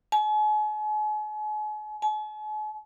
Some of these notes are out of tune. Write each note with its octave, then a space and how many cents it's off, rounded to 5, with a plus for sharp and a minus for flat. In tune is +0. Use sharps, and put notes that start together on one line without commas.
G#5 +40
G#5 +45